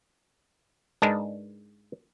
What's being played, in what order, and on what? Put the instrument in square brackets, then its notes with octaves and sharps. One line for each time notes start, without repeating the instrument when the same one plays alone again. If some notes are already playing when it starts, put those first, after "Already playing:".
[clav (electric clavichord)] G#2 G#3 D4 A#4 B4 A5